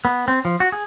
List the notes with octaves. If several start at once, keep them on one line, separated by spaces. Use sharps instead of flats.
B3
C4
F3
F#4
G#4